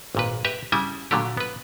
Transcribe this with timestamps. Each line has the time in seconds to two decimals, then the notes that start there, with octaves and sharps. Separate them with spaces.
0.15 G#1 A#2 B4
0.45 G4 B4 E5
0.72 C#3 G3 E4 E5 G#5
1.11 A#2 D3 F#3 A3 G4
1.37 B3 B4